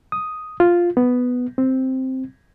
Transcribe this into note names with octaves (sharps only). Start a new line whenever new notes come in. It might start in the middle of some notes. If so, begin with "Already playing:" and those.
D#6
F4
B3
C4